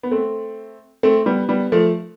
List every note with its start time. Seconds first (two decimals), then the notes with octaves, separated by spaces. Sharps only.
0.03 B3
0.11 A3 C4
1.03 A3 C4
1.26 G3 B3
1.49 G3 B3
1.72 F3 A3